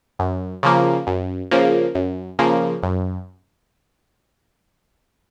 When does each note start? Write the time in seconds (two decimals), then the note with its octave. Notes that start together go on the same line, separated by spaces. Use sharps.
0.19 F#2
0.63 C#3 F3 A#3
1.07 F#2
1.51 C#3 F3 A#3
1.95 F#2
2.39 C#3 F3 A#3
2.83 F#2